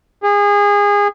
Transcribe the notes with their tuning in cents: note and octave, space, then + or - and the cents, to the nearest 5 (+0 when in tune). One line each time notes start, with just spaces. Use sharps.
G#4 -25